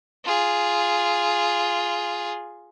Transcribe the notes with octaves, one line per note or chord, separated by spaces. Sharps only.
F4 G#4